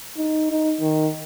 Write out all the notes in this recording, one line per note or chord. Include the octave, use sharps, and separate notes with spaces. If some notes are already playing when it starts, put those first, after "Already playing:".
D#4
D#4
D#3